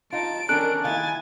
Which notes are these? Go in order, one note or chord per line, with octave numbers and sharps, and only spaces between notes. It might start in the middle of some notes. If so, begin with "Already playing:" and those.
D#4 F4 A5 D7
D#3 C#4 D4 A4 A#4 F#6
D#3 A#3 E4 G#5 A6